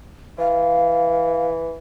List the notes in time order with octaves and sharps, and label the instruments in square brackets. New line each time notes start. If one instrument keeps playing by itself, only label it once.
[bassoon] E3 [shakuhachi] F5